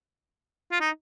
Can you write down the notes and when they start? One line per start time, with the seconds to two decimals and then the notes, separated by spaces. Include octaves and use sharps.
0.72 F4
0.81 D#4